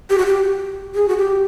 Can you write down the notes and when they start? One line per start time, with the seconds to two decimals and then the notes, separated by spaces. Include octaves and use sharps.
0.10 G4
0.18 F#4
0.26 G4
0.95 G#4
1.08 F#4
1.17 G4